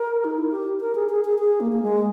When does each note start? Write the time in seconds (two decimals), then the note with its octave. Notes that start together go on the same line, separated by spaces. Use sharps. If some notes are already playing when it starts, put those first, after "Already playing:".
Already playing: A#4
0.25 D#4
0.38 E4
0.51 G4
0.81 A#4
0.95 G#4
1.09 G#4
1.25 G#4
1.39 G#4
1.60 A#3
1.72 A#3
1.83 G#3